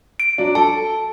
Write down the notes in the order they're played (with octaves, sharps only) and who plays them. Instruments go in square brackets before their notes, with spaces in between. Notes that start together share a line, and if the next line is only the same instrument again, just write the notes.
[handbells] D7
[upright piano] F#3 D4
[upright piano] A4 [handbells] A5